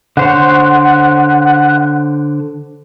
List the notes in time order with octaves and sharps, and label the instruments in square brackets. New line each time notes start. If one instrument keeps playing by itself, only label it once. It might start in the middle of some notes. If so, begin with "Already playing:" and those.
[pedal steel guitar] D3 C5 C#5 [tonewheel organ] F#5